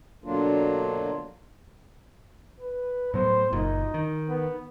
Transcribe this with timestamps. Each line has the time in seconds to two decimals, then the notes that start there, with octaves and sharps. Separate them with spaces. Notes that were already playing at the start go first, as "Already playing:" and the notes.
0.24 B2 D3 F#3 A#3 D4 F4
2.60 B4
3.14 A2 F#3 B3 C5
3.53 F#1 A#2 D#4
3.94 D#3
4.29 B3